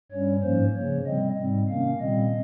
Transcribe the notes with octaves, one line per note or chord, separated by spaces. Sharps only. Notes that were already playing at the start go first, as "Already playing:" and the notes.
G2 G3 C#4 C#5
G#2 F3 A#3 C#4 C5
C#3 F3 A#3 C#5
C3 G3 C4 D#5
G#2 G3 C4
C3 D#3 A#3 C#4 F5
A#2 G3 C4 D#5